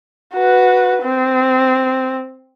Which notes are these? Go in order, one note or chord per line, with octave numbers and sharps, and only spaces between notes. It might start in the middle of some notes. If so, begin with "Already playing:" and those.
F#4 B4
C4